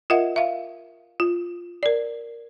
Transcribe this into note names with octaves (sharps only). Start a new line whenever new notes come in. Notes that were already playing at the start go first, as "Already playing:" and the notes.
F4 A#4 D#5 E5 F#5
E5 F5
F4
A#4 D5